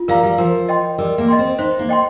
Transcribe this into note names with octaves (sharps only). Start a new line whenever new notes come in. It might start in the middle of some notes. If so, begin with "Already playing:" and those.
Already playing: F4
G3 A#4 F5 A#5
G3
F3 A#4
D#5 G5 C6
G3 A#4
A#3
D#5 G5 C6
C4
D#4 C5
A#3
D#5 G5 C6